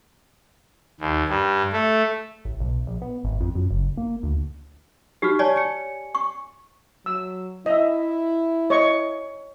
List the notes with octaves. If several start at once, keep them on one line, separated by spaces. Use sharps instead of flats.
D#2
G2
A3
A1
B1
A#1
B3
G#1
F2
F#2
F#1
A#3
D2
D#4 F#4 G4 F6
C#5 D5 G#5 A5 C#6
G#5 C#7
C#6
F#3 E6
E4 D#5 E5
C#5 D#5 C#6